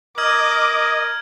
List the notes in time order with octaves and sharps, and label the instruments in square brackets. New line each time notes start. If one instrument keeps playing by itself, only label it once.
[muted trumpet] A#4 [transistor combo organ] D#5 [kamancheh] D6 [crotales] F6 G#6 F#7